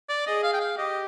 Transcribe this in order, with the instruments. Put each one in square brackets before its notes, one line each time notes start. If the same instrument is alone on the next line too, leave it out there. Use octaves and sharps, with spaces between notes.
[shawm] D5
[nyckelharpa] G#4 [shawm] D#5
[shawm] F5
G5
F5
[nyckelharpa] G4 [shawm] D#5